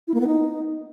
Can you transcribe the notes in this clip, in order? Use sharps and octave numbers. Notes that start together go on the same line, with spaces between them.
E4
A#3
B3
D#4